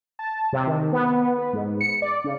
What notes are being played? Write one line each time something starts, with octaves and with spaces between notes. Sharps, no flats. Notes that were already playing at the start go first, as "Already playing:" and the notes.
A5
C3
D#3
B3
B4
G#2
C#7
D5
C#3